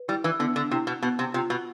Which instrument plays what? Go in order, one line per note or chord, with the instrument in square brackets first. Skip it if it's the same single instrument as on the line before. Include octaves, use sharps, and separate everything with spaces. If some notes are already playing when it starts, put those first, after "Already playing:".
Already playing: [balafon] B4
[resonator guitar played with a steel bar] G3 [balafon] E4
[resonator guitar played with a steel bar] E3
[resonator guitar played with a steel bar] D3 [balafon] B3
[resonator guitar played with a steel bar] D3
[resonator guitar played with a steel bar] C3 [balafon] E4
[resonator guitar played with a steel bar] B2
[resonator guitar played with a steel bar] B2 [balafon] B3
[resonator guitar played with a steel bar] C3
[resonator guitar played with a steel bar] C3 [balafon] F4
[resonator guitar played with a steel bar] B2